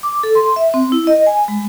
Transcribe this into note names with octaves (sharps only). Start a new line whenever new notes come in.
D6
A4
C6
E5
C4
E4
D#5
G#5
G#3